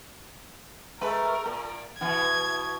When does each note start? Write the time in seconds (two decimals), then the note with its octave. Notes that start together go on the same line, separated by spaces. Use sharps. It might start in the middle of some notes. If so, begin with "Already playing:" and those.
1.01 G#3 A3 A#4 B4
1.46 A#2
2.01 B2 E3 G#6